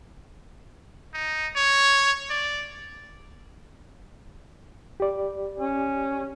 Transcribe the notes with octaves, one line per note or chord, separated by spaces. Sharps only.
D#4
C#5
D5
G4 D5
C#4